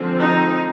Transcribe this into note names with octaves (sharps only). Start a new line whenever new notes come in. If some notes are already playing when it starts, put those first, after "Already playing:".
Already playing: D3 F3 G#3 C4
D#4